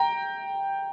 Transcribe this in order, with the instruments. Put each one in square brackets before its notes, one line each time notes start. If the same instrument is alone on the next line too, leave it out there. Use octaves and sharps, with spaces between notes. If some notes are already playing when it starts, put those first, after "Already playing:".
Already playing: [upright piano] G5 A#5